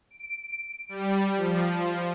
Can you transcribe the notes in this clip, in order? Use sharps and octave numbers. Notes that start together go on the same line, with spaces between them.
D7
G3
F3